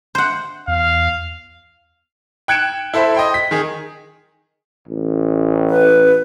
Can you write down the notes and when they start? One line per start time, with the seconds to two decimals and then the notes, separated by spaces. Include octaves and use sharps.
0.15 C5 F#5
0.68 E2 F5
2.48 G5 F#6 G#6 C#7 D7 E7
2.94 E4 A4 C5 E5 B5
3.15 D#5 G5 C6
3.34 B6
3.51 D#3 G#4
4.88 A1
5.70 B4